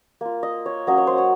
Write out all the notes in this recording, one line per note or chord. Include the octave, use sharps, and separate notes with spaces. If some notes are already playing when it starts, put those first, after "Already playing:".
A#3 F4
D#5
C#5
F#3 A#3 C#4 D#5
C#5
C5
C#5